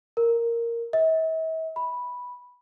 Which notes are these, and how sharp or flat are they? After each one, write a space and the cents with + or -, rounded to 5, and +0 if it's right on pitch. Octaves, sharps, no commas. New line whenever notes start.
A#4 -5
E5 -45
B5 -5